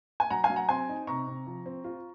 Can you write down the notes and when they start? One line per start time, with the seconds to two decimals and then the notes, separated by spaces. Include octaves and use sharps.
0.20 G#5
0.30 F#3 F#5 A#5
0.44 F5 G#5
0.50 F#3
0.56 F#5 A#5
0.69 C4 G#5 C6
0.89 D#4
1.07 C3 A#5 C#6
1.27 C3
1.47 F3
1.66 C4
1.84 F4